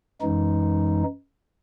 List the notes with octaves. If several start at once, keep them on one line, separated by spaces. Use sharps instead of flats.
F#2 E3 G#3 D#4